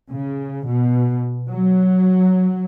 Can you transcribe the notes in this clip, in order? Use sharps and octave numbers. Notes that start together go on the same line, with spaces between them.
C#3
B2
F#3